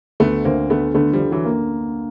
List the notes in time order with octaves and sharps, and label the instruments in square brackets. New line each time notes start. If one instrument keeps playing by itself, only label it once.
[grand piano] D2 [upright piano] A3 B3
[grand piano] D2 [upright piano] A#3 C4
[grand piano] D3 [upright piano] A3 B3
[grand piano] D3 [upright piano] A3 B3
[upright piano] F3 G3
[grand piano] D3
[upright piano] E3 F#3
[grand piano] A#3